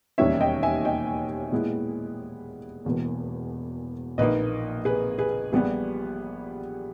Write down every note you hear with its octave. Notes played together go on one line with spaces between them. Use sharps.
E1 D#2 D#3 G3 C#4 C#5 E5
D#5 G5
E5 G#5
D#5 G5
A#2 G#3 B3 E4
E1 E2 B2 A#3
A#1 A#2 A#3 D#4 B4 D#5
G#4 B4
G#4 B4
A#1 A#2 G3 B3 G#4